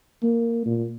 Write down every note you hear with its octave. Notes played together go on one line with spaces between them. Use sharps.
A#3
A#2